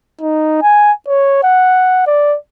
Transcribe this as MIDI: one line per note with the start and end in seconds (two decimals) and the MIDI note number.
0.21 0.62 63
0.63 0.92 80
1.07 1.41 73
1.43 2.05 78
2.07 2.36 74